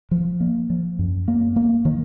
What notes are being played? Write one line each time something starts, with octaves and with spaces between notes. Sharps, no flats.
F3
A#3
F3
F#2
A#3
A#3
D#3